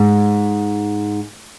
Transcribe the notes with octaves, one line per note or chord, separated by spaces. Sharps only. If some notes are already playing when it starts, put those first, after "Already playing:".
Already playing: G#2